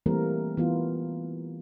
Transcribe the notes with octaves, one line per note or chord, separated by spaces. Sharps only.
E3 G3 A3 A#3 C4 A#4
E3 B3 F4